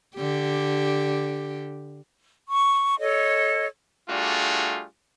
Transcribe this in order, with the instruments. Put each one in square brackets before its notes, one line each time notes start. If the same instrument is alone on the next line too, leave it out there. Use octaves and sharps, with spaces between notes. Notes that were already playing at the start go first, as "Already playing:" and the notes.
[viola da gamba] D3 G4
[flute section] C#6
A4 C#5 D#5
[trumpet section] G3 A3 D4 F4 F#4 G#4